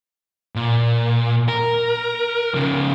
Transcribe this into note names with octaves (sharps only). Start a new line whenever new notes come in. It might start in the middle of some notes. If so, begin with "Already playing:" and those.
A#2
A#4
C#3 F3